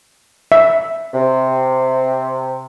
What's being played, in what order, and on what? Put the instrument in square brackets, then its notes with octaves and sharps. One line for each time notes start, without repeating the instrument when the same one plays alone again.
[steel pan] E5
[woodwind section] C3